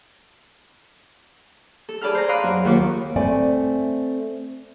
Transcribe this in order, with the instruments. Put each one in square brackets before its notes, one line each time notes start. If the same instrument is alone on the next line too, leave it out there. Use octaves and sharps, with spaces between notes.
[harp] A4
G#4 D5 A5 B5 F6
C5 A#5
F5 B5 C6 D6 D#6 F#6
F#2 F#4
D#2 F4 F#5 C#6 D6
[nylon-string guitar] A3 C4 A4 D5 G#5